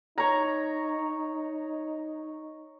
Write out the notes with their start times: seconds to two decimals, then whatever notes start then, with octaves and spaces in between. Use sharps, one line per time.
0.18 D#4 C#5 A#5